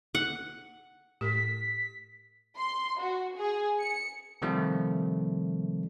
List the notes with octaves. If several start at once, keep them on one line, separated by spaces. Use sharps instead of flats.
F#5
A2 G4 A#4 B6
C6
F#4
G#4
C#7
C3 D#3 F3 G3 A3